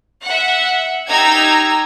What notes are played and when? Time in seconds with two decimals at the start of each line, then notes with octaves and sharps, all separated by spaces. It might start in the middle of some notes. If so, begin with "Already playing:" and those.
0.23 E5 F#5
1.07 D#4 G4 A#5 E6 G#6